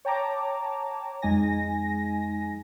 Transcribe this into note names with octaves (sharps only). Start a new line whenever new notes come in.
C#5 G5 A5 A#5 D6
F2 G#3 D#4 G#5 A#6